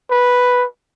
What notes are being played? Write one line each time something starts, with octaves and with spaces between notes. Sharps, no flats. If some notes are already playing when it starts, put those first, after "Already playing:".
B4